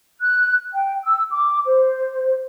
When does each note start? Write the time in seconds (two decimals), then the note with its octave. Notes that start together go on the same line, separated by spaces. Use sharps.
0.22 F#6
0.73 G5
1.04 E6
1.31 D6
1.66 C5